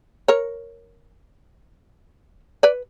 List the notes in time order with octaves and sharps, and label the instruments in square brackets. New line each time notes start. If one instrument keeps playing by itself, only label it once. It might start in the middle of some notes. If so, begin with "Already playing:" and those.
[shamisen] A#4 C#5
B4 D5